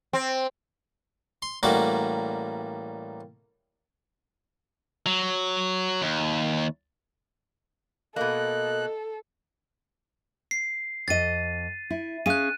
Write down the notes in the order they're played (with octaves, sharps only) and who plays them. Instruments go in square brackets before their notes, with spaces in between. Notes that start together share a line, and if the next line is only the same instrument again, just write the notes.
[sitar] C4
[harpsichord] C6
A1 G3 A#3 F#4 D6
[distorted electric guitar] F#3
D#2
[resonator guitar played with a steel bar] B2 A#3 [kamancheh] A4 [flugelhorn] D#5 [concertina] F#6
[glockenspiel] C7
[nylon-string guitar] F2 D#5 [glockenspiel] A6 D#7
[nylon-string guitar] E4
[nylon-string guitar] C#4 G#4 F5 [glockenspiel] F#6 D#7